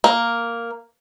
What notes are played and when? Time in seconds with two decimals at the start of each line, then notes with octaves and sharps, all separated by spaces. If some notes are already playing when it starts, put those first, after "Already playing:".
0.04 A#3